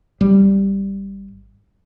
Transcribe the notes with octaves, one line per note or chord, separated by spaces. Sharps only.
G#1 G3